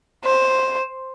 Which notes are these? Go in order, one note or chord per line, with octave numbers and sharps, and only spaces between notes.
C5